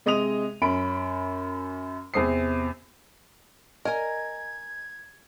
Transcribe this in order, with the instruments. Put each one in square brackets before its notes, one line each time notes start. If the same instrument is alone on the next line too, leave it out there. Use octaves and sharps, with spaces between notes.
[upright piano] C3 G#3 D#5 D#6 D#7 F7
F#2 C#4 B5 D7
E2 C3 C4 D#6 C7
[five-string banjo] A#4 [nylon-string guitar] D#5 G#5 [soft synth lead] G#6